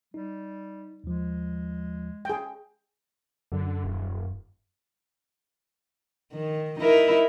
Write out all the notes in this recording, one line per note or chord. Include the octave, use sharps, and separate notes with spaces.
G3 D#4
D#2 F3 G#3
G#4 G5
F#2 D3
D#1
D#3
D#4 E4 A#4